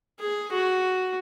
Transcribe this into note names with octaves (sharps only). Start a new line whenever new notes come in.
G#4
F#4